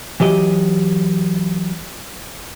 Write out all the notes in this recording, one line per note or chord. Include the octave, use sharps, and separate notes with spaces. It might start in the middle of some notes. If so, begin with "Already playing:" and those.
E3 F#3 G4 D#5